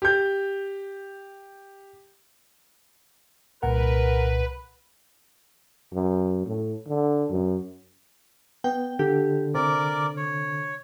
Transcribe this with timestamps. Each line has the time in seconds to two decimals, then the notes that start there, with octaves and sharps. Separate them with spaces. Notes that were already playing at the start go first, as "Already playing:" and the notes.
0.02 G4 G6
3.63 C2 A#2 A#4 B4 F#5
5.93 F#2
6.46 A2
6.87 D3
7.30 F#2
8.64 B3 G5
8.99 D3 G4
9.54 C3 A#4 D5 D6
10.17 C#5